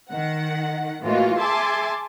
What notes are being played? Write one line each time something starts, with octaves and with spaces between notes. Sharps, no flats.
D#3 F#5
A2 E3 G#3 A#3 F4 F#4
G#4 E5 G#5 A5 C6 D6